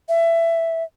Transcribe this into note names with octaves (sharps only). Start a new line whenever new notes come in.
E5